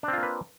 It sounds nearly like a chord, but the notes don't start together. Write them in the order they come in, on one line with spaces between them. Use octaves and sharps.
D4 C4 F4 A#3 B4